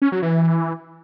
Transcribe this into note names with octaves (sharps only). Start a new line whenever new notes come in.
C#4
F#3
E3